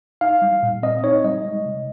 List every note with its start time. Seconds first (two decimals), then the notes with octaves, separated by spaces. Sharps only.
0.21 D#4 F5
0.42 G3
0.63 A#2
0.83 C4 D#5
1.04 D#4 C#5
1.24 G3 D#5
1.45 G#3
1.65 C3